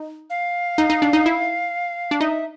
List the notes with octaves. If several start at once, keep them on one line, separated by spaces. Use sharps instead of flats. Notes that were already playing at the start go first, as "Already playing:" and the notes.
Already playing: D#4
F5
D#4
D#4
D4
D#4
E4
D4
D#4 E5